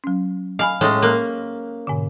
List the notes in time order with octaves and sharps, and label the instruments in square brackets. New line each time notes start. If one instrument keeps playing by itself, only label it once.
[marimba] F#3 C#4
[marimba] D#5 G#5 B5 [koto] F5
[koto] A2 G#3 C#4
[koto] A#3 [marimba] F#6
[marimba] G#2 B2 D3